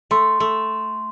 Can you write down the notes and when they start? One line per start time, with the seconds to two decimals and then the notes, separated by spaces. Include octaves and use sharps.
0.11 A3 C6
0.40 A3